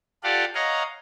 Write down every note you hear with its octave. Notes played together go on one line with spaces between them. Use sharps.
F4 G4 A4 D5 F5 F#5
C#5 D#5 F5 F#5 A#5